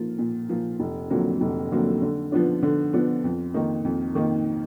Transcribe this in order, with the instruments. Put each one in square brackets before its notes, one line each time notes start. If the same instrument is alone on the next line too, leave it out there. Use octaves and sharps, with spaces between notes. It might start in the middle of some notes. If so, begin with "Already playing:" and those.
Already playing: [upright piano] F3 A#3 F4
A#2
F3 A#3 F4
F1
F2 D3 F#3 A#3
F1
F2 D3 F#3 A#3
D3
F3 B3 D4
D3
F3 B3 D4
F2
D#3 A#3 D#4
F2
D#3 A#3 D#4